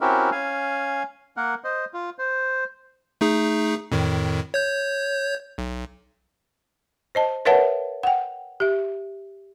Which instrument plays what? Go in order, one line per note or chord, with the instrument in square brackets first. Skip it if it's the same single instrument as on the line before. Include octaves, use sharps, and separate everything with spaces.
[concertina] C4 C#4 E4 F#4 G4 A#4
C#4 F5 G#5
A#3 A#4 F#5
C5 D#5
F4
C5
[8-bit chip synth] A3 D#4 G#4
F2 A2 D#3
C#5 G6
B1
[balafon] C5 D#5 A5
A#4 B4 C#5 E5 F#5 A5
F#5 G5
G4 E5